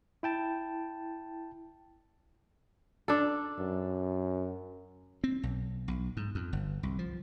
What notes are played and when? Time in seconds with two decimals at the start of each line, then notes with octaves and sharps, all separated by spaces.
0.23 E4 G5 A5
3.08 D4 A4
3.59 F#2
5.24 C4
5.43 B1
5.88 B1
6.17 G#2
6.35 F2
6.53 G1
6.83 C2
6.99 F3